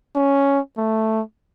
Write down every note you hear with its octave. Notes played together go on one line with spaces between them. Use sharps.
C#4
A3